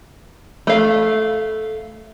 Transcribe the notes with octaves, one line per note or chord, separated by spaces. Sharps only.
A3 F5